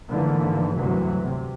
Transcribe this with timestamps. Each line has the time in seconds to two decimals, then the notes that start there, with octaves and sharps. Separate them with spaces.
0.10 G#2 D3 E3 F3 A3 A#3
0.78 D2 G2 C3 E3 F#3
1.24 C3